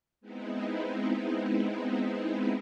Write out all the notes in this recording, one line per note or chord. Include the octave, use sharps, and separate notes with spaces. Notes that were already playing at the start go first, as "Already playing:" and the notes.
G#3 B3 C4 D#4 E4